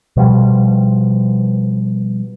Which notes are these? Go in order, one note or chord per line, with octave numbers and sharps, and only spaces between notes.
B2 F3 G3